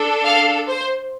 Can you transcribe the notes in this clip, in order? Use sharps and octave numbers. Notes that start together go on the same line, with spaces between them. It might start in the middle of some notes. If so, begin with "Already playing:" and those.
Already playing: D4 A4
F5
C5